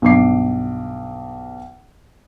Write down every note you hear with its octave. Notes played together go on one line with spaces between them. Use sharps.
B1 G2 D6 C7